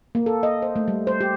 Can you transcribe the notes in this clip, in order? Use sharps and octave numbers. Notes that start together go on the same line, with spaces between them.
A#3
A4
D#5
C5
A3
G3
C5
G4